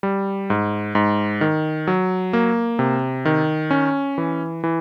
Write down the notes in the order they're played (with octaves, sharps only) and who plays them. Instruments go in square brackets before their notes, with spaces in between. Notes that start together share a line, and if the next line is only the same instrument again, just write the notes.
[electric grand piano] G3
G#2
G#2
D#3
F#3
A#3
C3
D#3
C#4
E3
E3